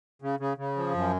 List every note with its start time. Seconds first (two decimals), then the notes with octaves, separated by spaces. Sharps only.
0.22 C#3
0.39 C#3
0.57 C#3
0.76 F3
0.94 F#2